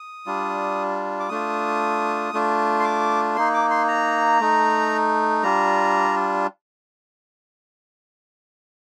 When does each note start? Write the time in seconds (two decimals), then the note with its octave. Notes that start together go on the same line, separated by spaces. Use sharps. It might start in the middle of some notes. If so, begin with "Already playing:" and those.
Already playing: D#6
0.26 G3 D4 F4
1.20 D6
1.29 A3 D4 F4 D#6
2.33 A3 D4 F4
2.80 C6
2.85 D6
3.36 A#3 D#4 C6
3.54 D6
3.71 C6
3.88 A#5
4.40 A3 D#4
5.43 G3 D4 F4 A#5